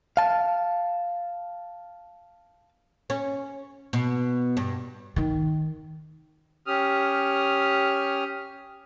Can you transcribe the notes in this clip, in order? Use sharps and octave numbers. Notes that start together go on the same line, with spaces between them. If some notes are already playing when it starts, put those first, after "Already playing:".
F5 A5
C#4
B2
G2
D#3
C#4 G4 D#6 F6